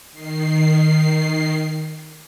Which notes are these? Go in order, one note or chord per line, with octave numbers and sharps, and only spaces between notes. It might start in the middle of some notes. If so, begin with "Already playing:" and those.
D#3 C7